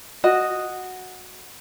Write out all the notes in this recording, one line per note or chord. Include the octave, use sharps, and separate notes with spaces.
F#4 D#5